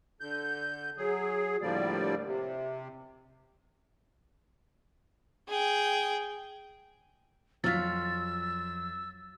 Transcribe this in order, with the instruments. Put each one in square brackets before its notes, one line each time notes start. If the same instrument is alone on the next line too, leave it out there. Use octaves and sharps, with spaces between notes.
[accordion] D3 G6
F#3 G#4
A2 D3 F3 G3 A#3 D5
C3
[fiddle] G#4 G5
[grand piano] F2 F6 B6 [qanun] F#3 F4 [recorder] E6 [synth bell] A6